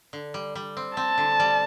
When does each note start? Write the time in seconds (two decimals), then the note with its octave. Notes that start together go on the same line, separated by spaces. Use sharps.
0.13 D3
0.34 G3
0.55 G3
0.77 C4
0.97 C4 A5
1.18 D3
1.40 G3